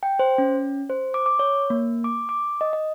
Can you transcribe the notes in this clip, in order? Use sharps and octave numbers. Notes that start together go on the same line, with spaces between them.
G5
C5
C#4
C5
D6
D6
C#5
A#3
D6
D6
D#5
D#5